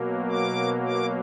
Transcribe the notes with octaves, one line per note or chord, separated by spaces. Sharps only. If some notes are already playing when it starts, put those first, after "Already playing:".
Already playing: B2 F#3 A#3
D6
D6